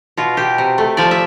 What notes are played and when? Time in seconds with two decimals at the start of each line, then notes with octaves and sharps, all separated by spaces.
0.17 B2 F4
0.37 B2 G4
0.58 C3
0.78 A3
0.97 F3 D5
1.11 E5